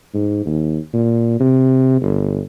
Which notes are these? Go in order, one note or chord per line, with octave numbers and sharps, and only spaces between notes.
G#2
D#2
A#2
C3
G1